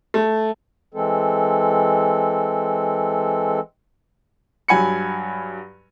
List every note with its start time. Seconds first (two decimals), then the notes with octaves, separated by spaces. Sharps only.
0.14 A3
0.94 E3 G#3 C4 A4
4.68 G2 F#3 G#5 B5 C#7